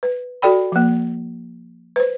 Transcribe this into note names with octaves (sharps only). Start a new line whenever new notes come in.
B4
F#4 A4 D5 G5 B5
F3 A#3
B4 C5